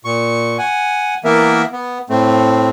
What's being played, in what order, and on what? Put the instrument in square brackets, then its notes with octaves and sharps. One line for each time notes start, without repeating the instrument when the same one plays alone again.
[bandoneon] A#2 C#6
F#5 G#5
E3 A#3 B3 A#4 E5
B3
A2 A3 C4